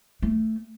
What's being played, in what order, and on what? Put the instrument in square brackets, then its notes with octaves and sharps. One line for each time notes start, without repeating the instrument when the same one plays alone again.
[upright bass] A3